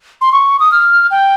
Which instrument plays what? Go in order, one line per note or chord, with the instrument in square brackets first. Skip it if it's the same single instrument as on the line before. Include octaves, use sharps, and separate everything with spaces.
[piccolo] C6
C#6
D#6
F6
G5